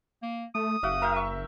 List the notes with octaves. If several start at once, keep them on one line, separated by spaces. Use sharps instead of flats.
A#3
A3 D#6
F#1 F#4 E5 F5
A#4 E5 G5
C#6 E6